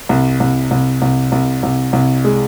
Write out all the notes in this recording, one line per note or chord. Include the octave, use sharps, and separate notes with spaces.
C2
C2
C2
C2
C2
C2
C2
G#3